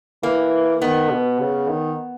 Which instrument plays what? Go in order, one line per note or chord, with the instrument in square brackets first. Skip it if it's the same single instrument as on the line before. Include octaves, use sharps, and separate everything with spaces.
[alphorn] E3 [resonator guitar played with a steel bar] A#3
[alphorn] D#3 [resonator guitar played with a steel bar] B3
[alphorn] B2
C#3
D#3